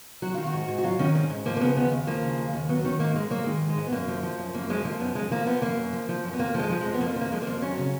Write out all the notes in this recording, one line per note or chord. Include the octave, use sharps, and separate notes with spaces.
F#3 F#4
D#3 F4
F#4
G#2
G#2
F#4
F#3 F4
D#3 C#4
G#2 C#4
G#2
F3 A#3
A#3
C#3 B3
D#2 B3
D#2
F3 A#3
C#3
D#2
D#2
F#3 B3
D#3 C#4
G#2 A#3
G#2 G#3
F#3 A#3
D#3 G#3
G#2
G#3
G#2
B3
F#2 A#3
F3
F3
F#2
F#2 A#3
F3 G#3
F3 A#3
F#2 B3
F#2 G#3
F3 A#3
F3 B3
F#2 A#3
F#2
F3
F3
F#2
B3
F2 A#3
F3
G#3
F3
F2 G#3
B3
F2 A#3
F3
A#3
F3 G#3
A#3
F2
F#3 C#4
C#3 C#4